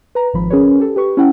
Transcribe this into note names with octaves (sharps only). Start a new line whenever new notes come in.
B4 A#5
G#1 F3 B5
C#4 G#4 A#4 B4 C#5
G4 A4
G4 B4 C#6
C#4 E4 F#5 G5